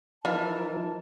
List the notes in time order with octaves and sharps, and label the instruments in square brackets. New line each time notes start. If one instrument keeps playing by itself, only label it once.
[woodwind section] E3 A5 [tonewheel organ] F3 D#4 A#4 [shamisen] F4 E5 F5